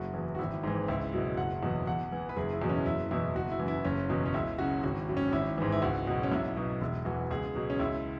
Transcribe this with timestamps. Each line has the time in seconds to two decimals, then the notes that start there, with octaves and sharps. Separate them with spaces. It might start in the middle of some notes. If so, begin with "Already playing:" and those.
Already playing: F#1 F#4
0.14 E2 E3
0.35 F#4
0.39 G#1 E4
0.63 G#2 E3
0.88 C#2 E4
1.13 B2 F#3 E4
1.37 F#1 F#5
1.63 E2 B2 F#3
1.87 E2 F#5
2.12 E3
2.29 B4
2.37 F#1 G#4
2.53 E4
2.62 E2 B2 F#3
2.69 C#4
2.85 F#1 E4
3.11 E2 B2 E4
3.35 F#1 F#4
3.51 E4
3.60 F#2 E3
3.68 E4
3.85 F#1 C#4
4.09 E2 B2 F#3
4.26 C#4
4.34 C#2 E4
4.58 C#3 F#3 F#4
4.83 G#1 F#4
5.08 F#2 F#3
5.17 C#4
5.32 G#1 E4
5.58 G#2 E3
5.72 E4
5.82 C#2 F#4
6.07 B2 F#3 F#4
6.23 C#4
6.32 B1 E4
6.56 B2 F#3
6.81 E1 E4
7.05 E2 E3 F#4
7.31 C#2 G#4
7.55 B2 F#3
7.70 C#4
7.80 C#2 E4